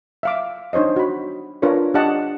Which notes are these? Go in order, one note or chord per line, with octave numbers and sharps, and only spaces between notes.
E5 F5 D6
D4 D#4 C5 C#5 D#5
F#4 B5
D4 F4 A#4 B4 C#5
D4 G4 D5 D#5 F#5 A5